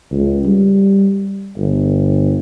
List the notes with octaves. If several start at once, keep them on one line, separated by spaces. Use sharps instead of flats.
C#2
G3
G1